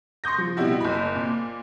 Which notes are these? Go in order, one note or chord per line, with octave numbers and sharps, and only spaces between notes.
C6 C#6 D#6 G6 A#6
F3
B2 G3 E4 F#4
F#1 B5
A#2